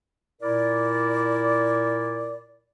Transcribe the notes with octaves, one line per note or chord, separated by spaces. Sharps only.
A#2 E4 A#4 D5